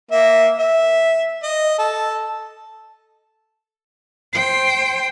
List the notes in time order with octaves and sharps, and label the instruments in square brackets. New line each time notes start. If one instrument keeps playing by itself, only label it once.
[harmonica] A#3 E5
E5
D#5
A4
[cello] C5 G5